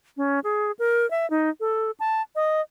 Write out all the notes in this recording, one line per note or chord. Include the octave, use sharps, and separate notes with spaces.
C#4
G#4
A#4
E5
D#4
A4
A5
D#5